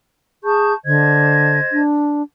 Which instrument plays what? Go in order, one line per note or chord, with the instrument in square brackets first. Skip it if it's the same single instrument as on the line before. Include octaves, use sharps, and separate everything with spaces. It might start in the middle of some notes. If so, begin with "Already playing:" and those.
[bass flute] G#4 [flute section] A5 C#6 G6
[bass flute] D3 [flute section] C5 D#5 G#6
[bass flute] D4